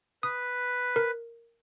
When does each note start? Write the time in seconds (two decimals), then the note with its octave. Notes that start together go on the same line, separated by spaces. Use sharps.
0.23 B4 D#6
0.96 A#4